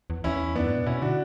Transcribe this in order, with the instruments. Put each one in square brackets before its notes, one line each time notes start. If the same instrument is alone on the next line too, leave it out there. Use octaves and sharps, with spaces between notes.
[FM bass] E2
[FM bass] E2 [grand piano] C#4 E4
[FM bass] F#2 [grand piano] B3 D4
[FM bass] G#2
B2
[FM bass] B2 [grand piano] C#4 E4
[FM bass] D3 [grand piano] D4 F#4